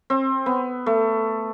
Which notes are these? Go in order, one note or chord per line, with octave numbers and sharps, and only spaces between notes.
C4
B3
A3